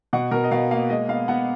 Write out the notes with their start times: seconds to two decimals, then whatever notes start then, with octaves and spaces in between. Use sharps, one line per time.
0.13 B2 F#5
0.31 B2 A#4
0.44 D#5
0.51 B2 F5
0.71 A#3 F5
0.90 G#3 D#5
1.09 B3 F5
1.28 B3 F#5